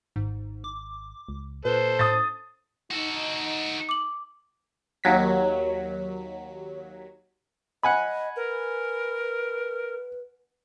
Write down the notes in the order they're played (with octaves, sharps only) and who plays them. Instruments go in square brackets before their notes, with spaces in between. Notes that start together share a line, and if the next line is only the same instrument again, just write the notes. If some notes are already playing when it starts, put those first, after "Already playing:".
[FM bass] G#1 [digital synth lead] G#2
[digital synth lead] D6
[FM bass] C#2
[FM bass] A#2 [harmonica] A4 C5 [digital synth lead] B4
[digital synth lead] A2 [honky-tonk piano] D#6 A6
[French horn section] D#4 [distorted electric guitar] F#4 A4
[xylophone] D6 F#7
[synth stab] D#2 F#3 B6
[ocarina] D#5 [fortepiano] F#5 G#5 B5
[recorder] A#4 [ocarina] B4